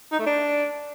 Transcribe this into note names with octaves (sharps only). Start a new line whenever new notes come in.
D#4
A3
D4